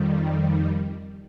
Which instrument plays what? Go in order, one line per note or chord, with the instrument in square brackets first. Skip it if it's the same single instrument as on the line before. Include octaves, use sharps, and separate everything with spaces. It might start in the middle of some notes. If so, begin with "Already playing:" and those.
Already playing: [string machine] F2 D#3 G3